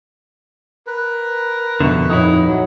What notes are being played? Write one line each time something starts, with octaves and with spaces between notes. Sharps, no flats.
A#4 B4
F2 B2 D3 E5 C#6
D#1 F2 D#3 D#4 E4 C#5
F#3 E4